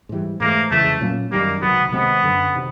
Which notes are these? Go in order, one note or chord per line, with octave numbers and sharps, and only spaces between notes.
G#2 E3 G3
G#2 E3 A3 A#3
F2 C#3 E3 G#3 A3
A#2 F#3 A#3 C#4
F#2 D#3 G3 A#3
C#2 C3 D#3 F#3 B3
C3 D#3 G#3 B3 C4
F#2 D3 F#3
C3 D#3